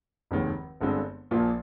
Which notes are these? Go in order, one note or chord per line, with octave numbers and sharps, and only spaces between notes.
F1 D#2 D#3 G#3
G1 G2 D3 G#3 C4
A#1 A#2 F3 A#3 F4